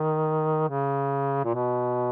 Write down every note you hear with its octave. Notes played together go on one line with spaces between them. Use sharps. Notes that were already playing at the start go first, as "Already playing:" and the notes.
Already playing: D#3
C#3
A#2
B2